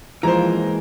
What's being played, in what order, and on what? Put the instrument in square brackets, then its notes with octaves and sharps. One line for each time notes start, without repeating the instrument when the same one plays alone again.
[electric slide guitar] E3 G#3 A#3 [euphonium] F3 [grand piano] C5 A#5